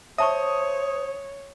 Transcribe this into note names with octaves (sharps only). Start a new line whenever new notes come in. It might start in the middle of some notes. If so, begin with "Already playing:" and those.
C5 C#5 E5 A5 C#6 D#6